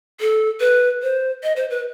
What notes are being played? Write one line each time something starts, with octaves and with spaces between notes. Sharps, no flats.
A4
B4
C5
D#5
C5
B4